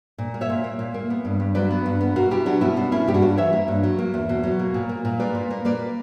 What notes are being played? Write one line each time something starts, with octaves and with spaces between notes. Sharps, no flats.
A#2
A#3
C#5 E5
A#2
A#3
A#2
A#3
B3
G2
G2
F#3 B4 D5
B3
G2
B3
B2 F#4 A#4
B2 E4 G4
F#3 D4 F#4
B3 C#4 E4
B2 D4
A#3 C#4 E4
G2 G4
D4 F#4
G2
E3 C#5 E5
A#3
G2
F#3
A#3
E2
B2
F#3
A#3
A#2
A#3
A#2
A#3 B4 D5
A#2
A#3
A#3 B4 D5